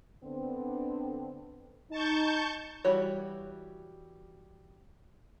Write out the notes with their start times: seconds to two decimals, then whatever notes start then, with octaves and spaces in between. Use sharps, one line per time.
0.24 D3 B3 C4
1.91 D#4 A5 C#6 G6
2.85 E3 G3 F#4 C#5